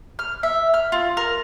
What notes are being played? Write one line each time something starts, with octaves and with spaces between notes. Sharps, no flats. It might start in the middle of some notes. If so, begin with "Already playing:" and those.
F6
E5
F6
F4
A#4